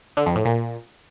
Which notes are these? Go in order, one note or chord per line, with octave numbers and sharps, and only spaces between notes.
D3
F2
A2
A#2